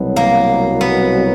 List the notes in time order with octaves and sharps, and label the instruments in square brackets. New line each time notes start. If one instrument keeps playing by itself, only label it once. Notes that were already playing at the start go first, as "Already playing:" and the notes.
Already playing: [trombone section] C2 B2 F#3
[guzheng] A#3
B3